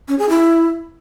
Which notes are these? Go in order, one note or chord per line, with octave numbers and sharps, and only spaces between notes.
C#4
G#4
E4